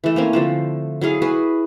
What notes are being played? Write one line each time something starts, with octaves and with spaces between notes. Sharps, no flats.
E3 A3
A#3 C4 C#4
D3 F3 A3
F#3 E4 G#4 F5
F#4 G#4 B4